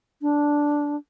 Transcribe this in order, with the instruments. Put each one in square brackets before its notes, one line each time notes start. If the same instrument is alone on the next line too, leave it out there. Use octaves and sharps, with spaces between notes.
[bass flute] D4